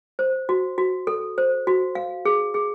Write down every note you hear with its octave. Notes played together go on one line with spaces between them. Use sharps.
C5
F#4
F#4
A4
C5
F#4
F5
G#4
G#4